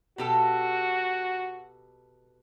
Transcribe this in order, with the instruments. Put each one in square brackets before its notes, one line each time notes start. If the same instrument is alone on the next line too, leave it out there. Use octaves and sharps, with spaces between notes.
[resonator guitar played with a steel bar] B2 G4 A4 [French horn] F#4